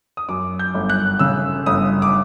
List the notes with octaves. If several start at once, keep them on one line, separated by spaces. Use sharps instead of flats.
D#6
F#2 D6
G6
G1
F#6
C#3 E6
G1 D#6
D6